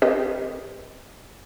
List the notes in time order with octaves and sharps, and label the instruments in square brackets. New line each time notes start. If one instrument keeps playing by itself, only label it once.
[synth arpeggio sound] C4 G4 A#4 B4 D#5